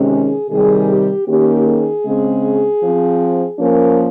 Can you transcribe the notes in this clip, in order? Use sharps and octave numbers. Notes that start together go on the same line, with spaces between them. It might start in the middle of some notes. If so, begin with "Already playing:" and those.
Already playing: C3 D#3 G#3 C#4
G#4
C3 D#3 G3 G#4
G4
D#3 A#3 C#4 G4
G#4
C#3 G#3 C4
F3 C4
F3 A#3 C#4 A#4